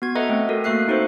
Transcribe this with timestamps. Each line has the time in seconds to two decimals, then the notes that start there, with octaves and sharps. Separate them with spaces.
0.02 B3 F#4 G#6
0.16 A4 B4 D#5 E5 F#5 A#5
0.29 A3 C4
0.49 A3 F#4 A4 A#4
0.64 A3 A#3 F#4 E5 F#6 C7
0.88 C4 D#4 F#4 A4 B4 C5